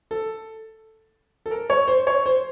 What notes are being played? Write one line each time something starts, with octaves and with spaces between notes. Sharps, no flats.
A4
A4
A#4
C#5
C5
C#5
C5